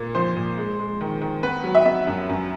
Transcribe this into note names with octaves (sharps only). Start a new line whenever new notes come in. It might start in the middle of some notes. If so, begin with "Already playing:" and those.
Already playing: A#2 A#3
F3 C5
A#2
G#3
G#3
D#3
D#3
B3 B4
F#3
E5
B3 E5
F#2
F#2